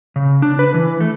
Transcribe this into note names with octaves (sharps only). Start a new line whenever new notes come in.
C#3
D4
B4
E3
A3